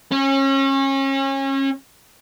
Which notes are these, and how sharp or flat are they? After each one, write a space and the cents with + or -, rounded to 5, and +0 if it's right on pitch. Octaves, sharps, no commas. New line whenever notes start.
C#4 -30